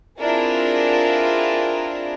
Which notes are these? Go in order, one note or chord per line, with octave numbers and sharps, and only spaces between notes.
C4 D4 E4 F4 G#4 A#4